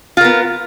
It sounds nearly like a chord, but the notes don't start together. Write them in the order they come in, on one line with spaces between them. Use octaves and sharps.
F4 A#4 B3